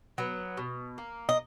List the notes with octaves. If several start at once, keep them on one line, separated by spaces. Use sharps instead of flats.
F#3 B3
B2
A#3
D#5